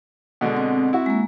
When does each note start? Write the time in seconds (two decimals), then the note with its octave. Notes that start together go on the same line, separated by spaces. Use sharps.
0.41 B2 D3 G#3
0.57 C4
0.93 E4 F#4
1.06 G#3 A#3